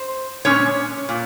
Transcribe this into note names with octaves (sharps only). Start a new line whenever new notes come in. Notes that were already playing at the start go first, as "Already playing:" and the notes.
Already playing: C5
A#2 G#3 C#4 C#5
A#2